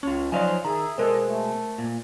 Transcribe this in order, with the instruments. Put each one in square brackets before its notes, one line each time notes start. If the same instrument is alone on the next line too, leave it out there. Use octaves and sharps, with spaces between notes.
[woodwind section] C#2 [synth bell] C#4 [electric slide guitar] F4 C#5
[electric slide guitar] F3 D#4 F5 [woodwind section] F#3 C5 [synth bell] D5 G#5
[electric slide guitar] D#3 [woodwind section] G#4 E5 [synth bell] A#5
[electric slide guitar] B2 G#3 [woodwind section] A4 D5 D#5 [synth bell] A#4 C5
[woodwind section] A3
[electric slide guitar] A#2